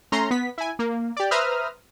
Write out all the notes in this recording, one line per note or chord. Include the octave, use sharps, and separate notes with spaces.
A3 C#4 A#5 C6
B3 B6
E4 G#5
A#3
G4 D5
B4 C5 E5 A#5 D#6 F6